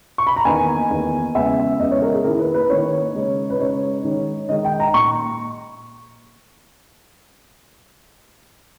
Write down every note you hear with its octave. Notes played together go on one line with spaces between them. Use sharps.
C#6
B5
A#5
E2 D#3 A#3 D#4 G#5
E2 D#3 A#3 D#4
E2 C#3 G#3 B3 E5
E2 C#3 G#3 B3 D#5
C#5
A#4
G#4
D#3 A#3 E4 A#4
B4
B4
D#3 A#3 E4 C#5
C#3 G#3 D#4
B4
C#3 G#3 D#4 C#5
D#3 G#3 D#4
D#3 G#3 D#4 D#5
G5
A#5
A#2 C#6